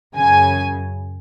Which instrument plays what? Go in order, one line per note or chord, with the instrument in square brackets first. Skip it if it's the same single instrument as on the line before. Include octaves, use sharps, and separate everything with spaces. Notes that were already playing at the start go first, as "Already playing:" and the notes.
[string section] F#2 C#3 G#5